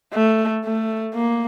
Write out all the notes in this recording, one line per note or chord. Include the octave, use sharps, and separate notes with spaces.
A3
A3
A#3